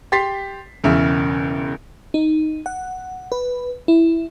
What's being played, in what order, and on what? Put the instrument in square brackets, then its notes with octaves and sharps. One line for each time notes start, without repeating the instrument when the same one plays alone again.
[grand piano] G4 C6 A6 B6 C7
E1 E2 C#3 E5
[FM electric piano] D#4
F#5
B4
E4